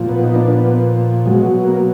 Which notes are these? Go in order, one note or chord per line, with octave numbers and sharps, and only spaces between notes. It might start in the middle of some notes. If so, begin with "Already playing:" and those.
Already playing: A#2 F3
B3
D#4
D4
B3
B2 F#3 G#3
A#3